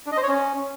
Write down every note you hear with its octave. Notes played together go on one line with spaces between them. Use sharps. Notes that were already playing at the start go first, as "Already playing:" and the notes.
D4
D#5
C5
C#5
C#4